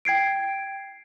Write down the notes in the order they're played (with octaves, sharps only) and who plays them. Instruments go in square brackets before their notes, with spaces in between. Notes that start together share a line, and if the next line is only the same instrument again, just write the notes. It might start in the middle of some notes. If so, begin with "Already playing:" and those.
[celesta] G5 G#6 C7 D7